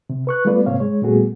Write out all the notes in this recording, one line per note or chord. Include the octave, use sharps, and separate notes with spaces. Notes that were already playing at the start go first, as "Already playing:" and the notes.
C3
B4 C#6 F#6
G3 A3 B3 F4 B4 D5
G#2 C3 A#3 C4 C#5 F5
G#3 C#5
A#2 G3 A3 B3 F#4 G#4